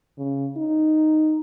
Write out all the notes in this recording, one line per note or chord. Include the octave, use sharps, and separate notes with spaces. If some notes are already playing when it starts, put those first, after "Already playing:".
C#3
D#4